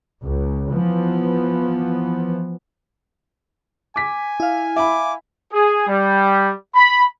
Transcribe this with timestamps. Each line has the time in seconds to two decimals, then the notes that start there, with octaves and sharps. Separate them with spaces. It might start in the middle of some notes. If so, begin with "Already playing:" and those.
0.22 C#2
0.72 E3 F3 B3
3.96 G#5 D6 B6
4.40 E4 F5
4.76 E5 B5 D6
5.52 G#4
5.87 G3
6.74 B5